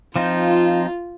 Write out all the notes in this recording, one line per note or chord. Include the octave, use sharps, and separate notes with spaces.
F3 C4 D#4 F4